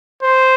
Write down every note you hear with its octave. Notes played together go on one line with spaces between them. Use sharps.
C5